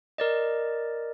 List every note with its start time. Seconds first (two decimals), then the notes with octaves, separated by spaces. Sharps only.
0.18 A#4 D5 D#5